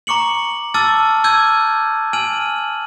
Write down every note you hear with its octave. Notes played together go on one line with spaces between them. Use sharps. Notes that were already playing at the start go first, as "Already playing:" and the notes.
A#5 C#6 D6 C#7 F#7
A5 D6 E6 F6 A6
D6 E6 F6 G6 G#6 D#7
G#5 F6 D#7 F#7